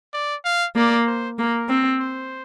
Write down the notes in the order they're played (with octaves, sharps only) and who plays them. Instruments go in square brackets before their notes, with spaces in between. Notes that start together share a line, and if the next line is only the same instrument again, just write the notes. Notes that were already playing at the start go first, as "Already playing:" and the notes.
[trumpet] D5
F5
[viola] A#3 [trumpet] D5
[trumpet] C5
[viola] A#3 [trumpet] A#4
[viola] C4
[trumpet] C5